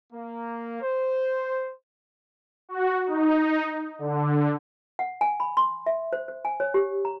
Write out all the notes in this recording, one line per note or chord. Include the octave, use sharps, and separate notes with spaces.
A#3
C5
F#4
D#4
D3
F#5
G#5
B5
C6
E5
C5
C5
G#5
C#5
G4
A#5